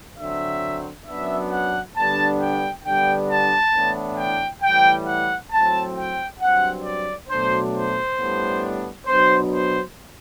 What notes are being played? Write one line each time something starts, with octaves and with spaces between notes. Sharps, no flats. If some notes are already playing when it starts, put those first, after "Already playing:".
D3 F#3 C4 E5
F#2 F#3 B3 D4 E5
F#5
D3 G3 B3 D4 A5
G5
D3 G3 B3 D4 G5
A5
A2 E3 B3 D4
G5
A2 E3 G3 G5
F#5
A2 F#3 C4 A5
G5
G2 F#3 C4 F#5
D5
B2 F#3 A3 D4 C5
C5
A2 G3 B3 D4
B2 F#3 B3 D4 C5
C5